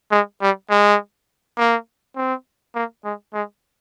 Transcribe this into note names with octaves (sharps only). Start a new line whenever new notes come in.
G#3
G3
G#3
A#3
C4
A#3
G#3
G#3